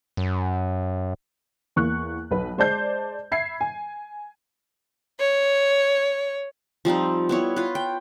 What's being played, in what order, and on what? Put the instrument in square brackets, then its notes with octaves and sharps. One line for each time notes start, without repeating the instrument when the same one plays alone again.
[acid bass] F#2
[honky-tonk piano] E2 A#3 C#6 F#6
B1 B4
G#3 C5 D5 A5 G6 C7
E5 B5 G#6 C7
G#5
[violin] C#5
[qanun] F3 G3 C4 D#4
B3 E4 C#5
F4 B4
G5